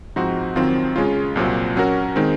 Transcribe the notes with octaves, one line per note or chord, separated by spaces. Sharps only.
G#2 F3 C4 D#4 F#4
F2 D#3 F#3 C4 F4
C#3 G#3 C#4 F4
C2 A#2 F#3 C4
F#3 C#4 F#4 A#4
D#3 G#3 C4 D#4